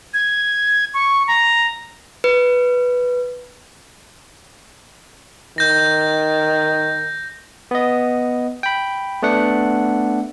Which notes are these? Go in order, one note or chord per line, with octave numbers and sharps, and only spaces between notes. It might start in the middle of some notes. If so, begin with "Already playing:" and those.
G#6
C#6
A#5
B4
D#3 G6 A#6
B3 D#5
G5 B5
A3 B3 D4 F#5